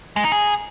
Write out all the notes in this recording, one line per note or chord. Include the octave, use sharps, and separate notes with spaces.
G#3
D#4
G#4